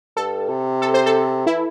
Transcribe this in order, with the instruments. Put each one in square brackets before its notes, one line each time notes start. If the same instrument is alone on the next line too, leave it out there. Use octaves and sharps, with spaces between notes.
[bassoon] G2 [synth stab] A4
[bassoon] C3
[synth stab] A4
C5
A4
[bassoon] E3 [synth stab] E4